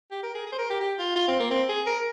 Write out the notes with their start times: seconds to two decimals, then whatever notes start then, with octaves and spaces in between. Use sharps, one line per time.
0.11 G4
0.23 A#4
0.35 G#4
0.46 G#4
0.52 C5
0.58 A#4
0.70 G4
0.81 G4
0.99 F4
1.16 F4
1.28 C4
1.40 A#3
1.51 C4
1.69 G#4
1.86 A#4